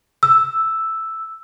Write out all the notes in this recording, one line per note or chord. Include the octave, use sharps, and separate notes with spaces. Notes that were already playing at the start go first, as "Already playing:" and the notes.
E6